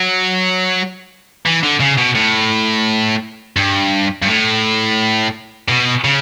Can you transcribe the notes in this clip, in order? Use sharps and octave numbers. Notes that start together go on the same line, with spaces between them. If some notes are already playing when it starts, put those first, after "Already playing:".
Already playing: F#3
E3
D3
C#3
B2
A2
G2
G2
A2
B2
C#3